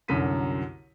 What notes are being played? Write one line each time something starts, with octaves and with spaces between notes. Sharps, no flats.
C2 F#2 D3 F#3 B6 D#7